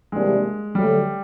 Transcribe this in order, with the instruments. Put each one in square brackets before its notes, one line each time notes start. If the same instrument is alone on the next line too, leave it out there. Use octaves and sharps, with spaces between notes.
[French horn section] C3 E3 G3 A#3 D4 [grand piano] G#3
[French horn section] D3 F#3 A3 [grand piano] G3